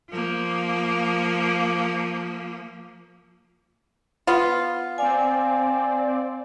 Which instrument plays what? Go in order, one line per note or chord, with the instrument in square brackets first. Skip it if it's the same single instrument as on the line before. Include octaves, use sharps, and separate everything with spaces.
[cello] F3 A#3
[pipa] B3 F4
[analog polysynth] C4 D5 [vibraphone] F5 G#5